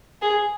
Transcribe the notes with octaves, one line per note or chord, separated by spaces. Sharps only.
G#4